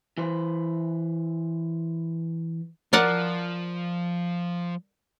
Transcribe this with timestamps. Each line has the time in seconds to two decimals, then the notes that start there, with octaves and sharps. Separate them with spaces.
0.18 E3 B4 C5
2.93 F3 A#4 D5 F#5